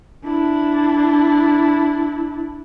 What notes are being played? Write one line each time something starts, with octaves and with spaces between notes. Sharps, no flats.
D4 E4